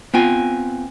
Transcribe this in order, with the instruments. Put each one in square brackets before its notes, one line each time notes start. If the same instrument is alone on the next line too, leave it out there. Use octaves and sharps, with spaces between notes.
[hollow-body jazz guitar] B3 F4 [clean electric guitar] C4 G5 G#5